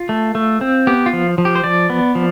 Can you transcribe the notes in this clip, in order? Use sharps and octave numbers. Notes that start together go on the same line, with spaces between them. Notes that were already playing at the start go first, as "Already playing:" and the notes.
Already playing: F4
A3
A3
C4
B3 G4
F4
F3
F3
G4
C5
F3 D5
B3
F3